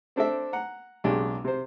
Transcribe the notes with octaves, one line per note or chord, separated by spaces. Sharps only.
C4 D4 A4 C5 E5
F#5 A#5
B1 C#3 G#3 D4 G4
C3 C5